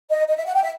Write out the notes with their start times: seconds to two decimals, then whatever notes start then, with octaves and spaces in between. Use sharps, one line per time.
0.10 D#5
0.28 D#5
0.36 E5
0.46 F#5
0.54 G5
0.63 E5